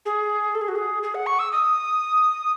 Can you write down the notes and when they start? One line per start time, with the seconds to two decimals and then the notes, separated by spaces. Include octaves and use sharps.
0.06 G#4
0.55 A4
0.61 G#4
0.68 F#4
0.75 G#4
1.03 G#4
1.15 F#5
1.26 C#6
1.39 E6
1.52 D#6